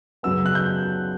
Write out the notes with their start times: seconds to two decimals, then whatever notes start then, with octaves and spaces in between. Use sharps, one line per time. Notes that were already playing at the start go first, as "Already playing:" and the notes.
0.23 F#2 C#3 F#3 B3 E6
0.46 F#6
0.55 G6